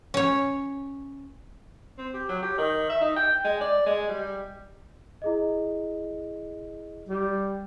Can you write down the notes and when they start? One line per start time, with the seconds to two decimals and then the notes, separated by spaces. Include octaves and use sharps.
0.14 C#4 C#5
1.98 C4
2.13 G4
2.29 F#3
2.42 G4
2.58 D#3
2.89 E5
3.01 D#4
3.16 G5
3.44 G#3
3.61 D5
3.86 G#3
4.09 G3
5.22 E4 G#4 D#5
7.09 G3